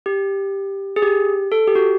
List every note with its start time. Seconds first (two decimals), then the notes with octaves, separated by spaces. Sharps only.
0.06 G4
0.96 G#4
1.02 G4
1.52 A4
1.67 G4
1.75 F#4